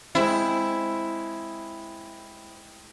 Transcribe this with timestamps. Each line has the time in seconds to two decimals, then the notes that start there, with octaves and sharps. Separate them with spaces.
0.15 G#3 C4 E4